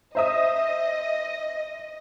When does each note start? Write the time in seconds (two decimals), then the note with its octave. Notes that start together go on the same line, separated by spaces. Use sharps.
0.15 C5 D#5 E5 D#6